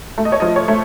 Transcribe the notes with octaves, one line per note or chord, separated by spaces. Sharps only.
A3
D#5
C#5
F3 D#5
C#5
A3